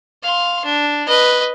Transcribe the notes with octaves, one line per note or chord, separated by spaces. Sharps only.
F5 C6
D4
B4 D#5